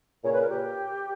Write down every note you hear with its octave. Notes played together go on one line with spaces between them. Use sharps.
A#2 C#3 C#5
B4
A#4
G4